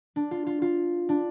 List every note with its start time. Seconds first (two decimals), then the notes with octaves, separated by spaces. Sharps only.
0.16 D4
0.31 F4
0.47 F4
0.62 F4
1.09 D4